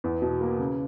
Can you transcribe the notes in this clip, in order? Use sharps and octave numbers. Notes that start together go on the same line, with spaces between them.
E2
B2
A#3
C#3